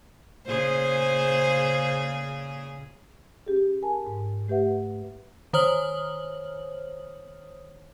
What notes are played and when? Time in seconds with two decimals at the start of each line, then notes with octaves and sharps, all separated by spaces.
0.46 A#2 C#3 G#4 C5
3.46 C#4 G4 G#4
3.82 A#4 G#5 A5
4.07 G#2
4.48 A3 G4 B4 E5 F#5
5.53 D#3 C5 C#5 D#6 F6 F#7